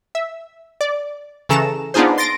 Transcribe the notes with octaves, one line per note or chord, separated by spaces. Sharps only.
E5
D5
C#3 E3 C#4 A4 A#5 E7
B3 D4 D#4 F4 G#4 C5
C6 A6 A#6 D7